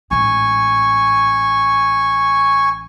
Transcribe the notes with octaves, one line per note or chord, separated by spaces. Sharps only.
A1 G#2 G#5 C#6